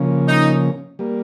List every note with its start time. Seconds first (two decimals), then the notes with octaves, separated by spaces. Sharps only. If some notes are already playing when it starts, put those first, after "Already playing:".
Already playing: C#3 F3 A#3 C#4
0.28 D#4
0.99 G3 A#3